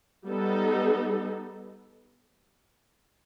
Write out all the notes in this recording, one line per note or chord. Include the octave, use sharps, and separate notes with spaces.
G3 B3 D#4 A4